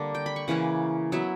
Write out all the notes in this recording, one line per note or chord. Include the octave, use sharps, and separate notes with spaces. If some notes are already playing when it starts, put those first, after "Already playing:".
Already playing: D3 G3 A#3 D4
G5
B5
C#6
C#3 E3 A#3 C#4 F#5
F#3 B3 E4 E5